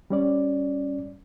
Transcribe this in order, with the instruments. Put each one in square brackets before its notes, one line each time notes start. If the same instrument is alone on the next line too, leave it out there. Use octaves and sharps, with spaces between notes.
[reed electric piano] G3 C#4 D5